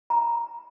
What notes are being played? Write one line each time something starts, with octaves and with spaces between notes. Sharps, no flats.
A#5